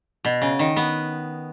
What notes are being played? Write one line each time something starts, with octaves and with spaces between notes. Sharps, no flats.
B2
C#3
D#3
B3